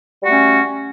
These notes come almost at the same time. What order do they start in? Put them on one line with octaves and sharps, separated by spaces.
G3 F#4 A3 C#4